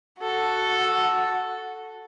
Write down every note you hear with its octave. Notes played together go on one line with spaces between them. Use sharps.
F#4 A4